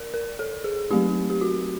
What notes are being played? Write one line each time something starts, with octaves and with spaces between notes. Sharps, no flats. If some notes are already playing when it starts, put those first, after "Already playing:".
Already playing: A#4 D5
A#4
A4
G#4
F#3 A3 C4 D#4 G4
G4
F#4